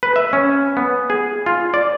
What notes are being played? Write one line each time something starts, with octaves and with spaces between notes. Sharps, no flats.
B4
E5
C#4
B3
G#4
F4
D5